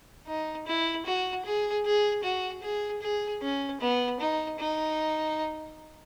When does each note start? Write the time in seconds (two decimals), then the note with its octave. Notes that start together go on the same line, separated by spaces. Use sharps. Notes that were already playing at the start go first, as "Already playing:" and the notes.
0.27 D#4
0.67 E4
1.06 F#4
1.45 G#4
1.85 G#4
2.23 F#4
2.63 G#4
3.02 G#4
3.42 C#4
3.81 B3
4.20 D#4
4.59 D#4